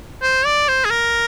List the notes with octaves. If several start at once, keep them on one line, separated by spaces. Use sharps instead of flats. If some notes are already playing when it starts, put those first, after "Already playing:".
C5
D5
C5
G#4
A#4